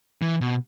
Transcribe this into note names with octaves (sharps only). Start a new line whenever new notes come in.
E3
B2